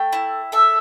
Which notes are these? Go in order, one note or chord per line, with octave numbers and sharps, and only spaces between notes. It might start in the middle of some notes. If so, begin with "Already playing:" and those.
Already playing: A3 G5
E4
A4 E5